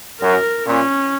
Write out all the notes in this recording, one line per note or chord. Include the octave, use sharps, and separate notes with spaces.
F#2 A#4
A#2 C#4